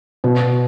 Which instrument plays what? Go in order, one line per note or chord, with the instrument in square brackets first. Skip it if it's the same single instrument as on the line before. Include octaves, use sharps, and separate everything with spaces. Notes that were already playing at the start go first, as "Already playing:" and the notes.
[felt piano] B2